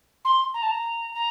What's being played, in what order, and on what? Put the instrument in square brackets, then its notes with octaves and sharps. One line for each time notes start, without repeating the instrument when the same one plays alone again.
[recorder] C6
A#5
A5
A#5
A#5